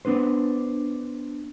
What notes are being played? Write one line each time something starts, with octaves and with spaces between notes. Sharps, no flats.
B3 D4 B4 C5